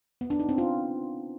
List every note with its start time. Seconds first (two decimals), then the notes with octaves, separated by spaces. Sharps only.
0.21 B3
0.30 D4
0.40 D#4
0.49 C4
0.58 F4